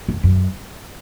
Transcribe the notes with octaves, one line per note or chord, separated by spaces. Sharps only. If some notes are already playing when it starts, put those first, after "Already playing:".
F2
F#2